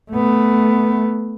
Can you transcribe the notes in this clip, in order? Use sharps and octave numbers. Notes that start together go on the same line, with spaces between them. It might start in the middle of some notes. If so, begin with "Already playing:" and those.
A3 B3